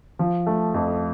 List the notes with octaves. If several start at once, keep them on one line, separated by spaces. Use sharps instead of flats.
F3
A3
F2